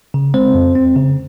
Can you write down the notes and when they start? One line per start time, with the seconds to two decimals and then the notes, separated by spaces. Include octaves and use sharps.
0.14 C#3
0.34 G#3 C4 C5
0.54 F2
0.75 C4
0.96 C#3